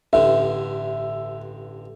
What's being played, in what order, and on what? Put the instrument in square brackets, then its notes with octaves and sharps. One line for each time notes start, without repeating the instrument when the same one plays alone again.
[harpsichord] A1 G2 D3 [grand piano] E5